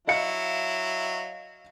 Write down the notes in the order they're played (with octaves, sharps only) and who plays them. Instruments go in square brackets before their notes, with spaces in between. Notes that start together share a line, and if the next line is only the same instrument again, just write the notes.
[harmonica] F#3 E4 [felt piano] D#5 F5 C#7